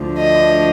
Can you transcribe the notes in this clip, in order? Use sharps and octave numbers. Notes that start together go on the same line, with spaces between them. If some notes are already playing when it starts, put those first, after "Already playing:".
Already playing: D2 D3 F3
D#5